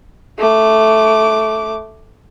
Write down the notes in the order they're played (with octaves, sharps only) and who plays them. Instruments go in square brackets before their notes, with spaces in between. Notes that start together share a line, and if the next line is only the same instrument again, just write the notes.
[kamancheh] A3 D6